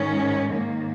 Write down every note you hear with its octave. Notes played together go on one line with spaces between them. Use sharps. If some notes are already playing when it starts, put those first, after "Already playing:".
Already playing: G#2 D#3 C#4
G#2 D#3 A#3